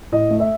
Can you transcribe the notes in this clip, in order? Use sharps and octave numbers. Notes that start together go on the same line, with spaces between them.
A2 D#5
A3
E5